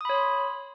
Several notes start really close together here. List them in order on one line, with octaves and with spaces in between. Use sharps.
D#6 B5 C#5 C6